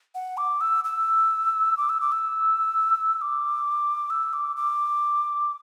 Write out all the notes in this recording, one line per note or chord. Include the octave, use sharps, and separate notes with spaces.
F#5
D6
E6
E6
D6
E6
D6
E6
E6
D6
E6
D6
D6